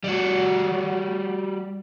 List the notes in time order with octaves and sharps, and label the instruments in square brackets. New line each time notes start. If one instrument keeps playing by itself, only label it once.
[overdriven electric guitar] G3 F#4